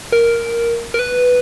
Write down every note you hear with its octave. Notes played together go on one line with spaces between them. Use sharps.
A#4
A#4
B4